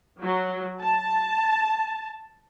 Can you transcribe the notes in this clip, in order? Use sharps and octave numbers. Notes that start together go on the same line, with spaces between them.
F#3
A5